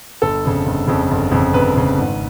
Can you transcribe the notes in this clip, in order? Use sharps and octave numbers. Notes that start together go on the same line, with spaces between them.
G1 A4
F2 C#3
G1
F2 C#3
G1
F2 C#3
G1 B4
F2 C#3
G#1